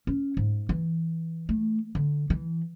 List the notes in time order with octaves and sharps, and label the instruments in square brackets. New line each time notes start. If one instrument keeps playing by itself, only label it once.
[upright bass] C#4
G#2
E3
A3
D3
E3